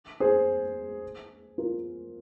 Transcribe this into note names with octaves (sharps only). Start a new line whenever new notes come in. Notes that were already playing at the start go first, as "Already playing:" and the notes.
G#4 C5
F4 A#4